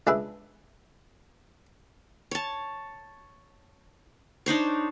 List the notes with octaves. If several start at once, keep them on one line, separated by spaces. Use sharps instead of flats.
C#2 D4 G#4 B4 E5
C#5 A5
D4 D#4 C5 C#5